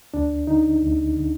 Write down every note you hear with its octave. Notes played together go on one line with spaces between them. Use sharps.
D2 D4
D3 D#4
D2
D3